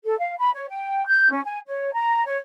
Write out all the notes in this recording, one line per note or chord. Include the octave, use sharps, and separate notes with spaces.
A4
F5
B5
C#5
G5
G6
C#4
G#5
C#5
A#5
C#5